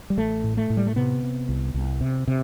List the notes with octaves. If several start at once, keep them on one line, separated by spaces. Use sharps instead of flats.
G3
A1 A3
A2
A3
A2
G3
A3
C3 B3
C3
C2
C2
C3
C3